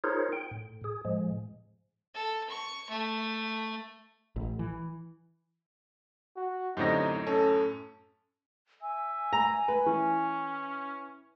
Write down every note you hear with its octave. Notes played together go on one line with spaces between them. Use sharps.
D#4 F4 G#4 A#4 C5 C#5
G5
A2
G#4
A2 F3 G#3
A4
C#6
A3
A1
E3
F#4
F#2 A2 D3 C4 D#4 G4 A#6
C#4 A4
E5 G#5
A#5
B4
E3 C#4